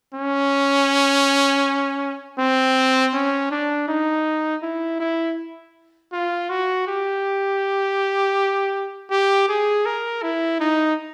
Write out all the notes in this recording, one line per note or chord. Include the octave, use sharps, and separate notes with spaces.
C#4
C4
C#4
D4
D#4
E4
E4
F4
F#4
G4
G4
G#4
A#4
E4
D#4